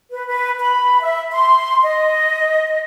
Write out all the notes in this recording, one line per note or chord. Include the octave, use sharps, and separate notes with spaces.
B4
B4
B5
E5
C6
D#5